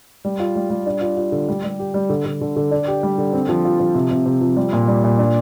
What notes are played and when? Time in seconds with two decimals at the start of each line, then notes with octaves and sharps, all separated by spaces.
0.25 G3
0.40 F4
0.55 G3
0.70 G3
0.86 D4
1.01 F4
1.17 F4
1.32 D3
1.48 G3
1.64 G3
1.79 G4
1.94 G3
2.10 D3
2.26 D3
2.41 D3
2.56 D3
2.71 D4
2.88 G4
3.03 G3
3.18 D3
3.33 C4
3.49 F3
3.65 F4
3.80 F3
3.95 C3
4.11 C3
4.26 C3
4.41 F3
4.56 G3
4.73 A#2
4.88 G3
5.04 A#2
5.19 D4